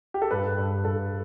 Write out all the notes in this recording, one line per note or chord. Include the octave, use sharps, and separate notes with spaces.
G4
A4
G2 B4
G2
G2 A4